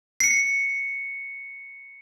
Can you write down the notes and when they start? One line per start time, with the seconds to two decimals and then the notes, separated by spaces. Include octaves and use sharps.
0.20 C7 C#7